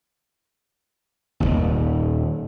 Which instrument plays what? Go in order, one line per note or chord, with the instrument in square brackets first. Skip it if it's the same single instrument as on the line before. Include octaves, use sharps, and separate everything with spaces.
[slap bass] D#1 G#1 D#2